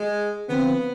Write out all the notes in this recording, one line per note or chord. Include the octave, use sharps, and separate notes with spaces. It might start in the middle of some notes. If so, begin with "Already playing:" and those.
Already playing: G#3
D3 F3 B3 C4